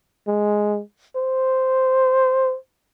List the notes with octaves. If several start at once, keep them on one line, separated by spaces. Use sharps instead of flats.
G#3
C5